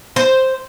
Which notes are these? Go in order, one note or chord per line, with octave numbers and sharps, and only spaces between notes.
C5